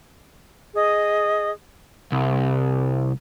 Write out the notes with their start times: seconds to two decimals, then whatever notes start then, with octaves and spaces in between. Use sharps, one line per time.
0.75 G#4 D#5 D#6
2.12 C2